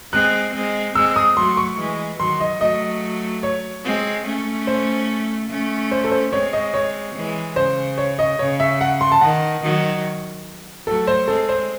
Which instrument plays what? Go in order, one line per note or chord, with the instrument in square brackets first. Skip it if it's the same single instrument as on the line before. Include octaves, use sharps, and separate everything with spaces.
[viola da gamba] G#3 C4 [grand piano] F#6
[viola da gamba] G#3 C4
[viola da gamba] G#3 C4 [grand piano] E6
[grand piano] D#6
[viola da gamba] F#3 A3 [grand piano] C6
[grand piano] C#6
[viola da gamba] E3 G#3
[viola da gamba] D#3 F#3 [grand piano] C6
[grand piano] D#5
[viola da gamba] F#3 A3 [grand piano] D#5
[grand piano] C#5
[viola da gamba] G#3 C4
A3 C#4
[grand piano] C5
[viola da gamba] A3 C#4
[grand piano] C5
A4
C5
[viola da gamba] G#3 C4 [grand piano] C#5
[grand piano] D#5
C#5
[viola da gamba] E3 G#3
[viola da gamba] C#3 [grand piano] C5
[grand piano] C#5
D#5
[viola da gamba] C#3 [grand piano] C#5
[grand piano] E5
F#5
C6
A5
[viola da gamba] D#3 [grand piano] F#5
[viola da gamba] D#3 F#3
[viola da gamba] F#3 A3 [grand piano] A4
[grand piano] C5
[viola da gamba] G#3 C4 [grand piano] A4
[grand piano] C5